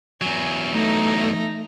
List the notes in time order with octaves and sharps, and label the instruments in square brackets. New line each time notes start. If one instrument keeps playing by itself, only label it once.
[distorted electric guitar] E2 F#3 [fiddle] G#5
[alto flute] A3 [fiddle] D#4 A#5